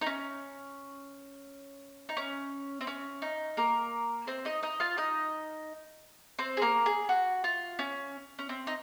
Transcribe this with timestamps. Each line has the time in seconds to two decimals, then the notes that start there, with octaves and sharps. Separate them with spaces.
0.01 D#4
0.06 C#4
2.09 D#4
2.17 C#4
2.81 C4
2.87 C#4
3.22 D#4
3.57 A#3 A#4
4.27 C4 C5
4.45 D#4 D#5
4.63 D#4 D#5
4.80 F4 F5
4.97 D#4 D#5
6.39 C4 C5
6.57 G#4
6.62 A#3 A#4
6.86 G#4
7.09 F#4
7.44 F4
7.79 C#4
8.39 C#4
8.49 C4
8.67 D#4